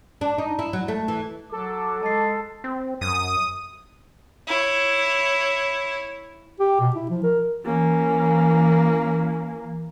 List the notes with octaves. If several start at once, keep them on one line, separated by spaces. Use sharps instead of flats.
D4
D#4
E4
F#3
A3
E3
F#3 A4 D6
G#3 A5 A6 C7
C4
F#2 D#6
E4 C#5
G4
B2
E4
F3
A#4
E3 A#3 C#4